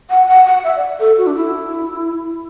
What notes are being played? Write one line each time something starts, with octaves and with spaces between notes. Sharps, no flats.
F#5
F#5
F#5
E5
D5
A4
F#4
D4
E4